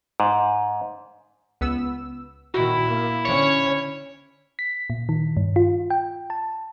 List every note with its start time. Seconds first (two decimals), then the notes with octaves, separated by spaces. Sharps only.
0.20 G#2
1.61 C#2 B3 E6
2.54 A#2 D#3 E4 F#4 E6
2.87 A#3
3.25 D3 C#4 C#5
4.59 B6
4.90 A#2
5.09 D#3
5.37 G2
5.56 F4
5.90 G5
6.30 A5